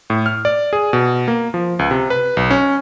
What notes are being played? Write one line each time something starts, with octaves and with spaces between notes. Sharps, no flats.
A2
F6
D5
G#4
B2
A#3
F3
C#2
C3
B4
B1
C#4